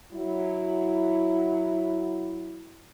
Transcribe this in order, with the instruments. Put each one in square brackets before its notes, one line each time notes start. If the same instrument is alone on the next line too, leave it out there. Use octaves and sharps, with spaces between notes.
[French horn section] F#3 E4